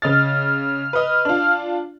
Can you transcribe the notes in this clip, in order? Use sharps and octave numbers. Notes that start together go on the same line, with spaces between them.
C#3 D#5 F6 A6
B4 D#5
D4 F4